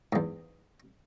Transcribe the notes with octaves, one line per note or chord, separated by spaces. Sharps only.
E2 G#2